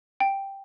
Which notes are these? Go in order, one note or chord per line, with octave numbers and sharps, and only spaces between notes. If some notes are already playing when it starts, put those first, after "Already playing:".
G5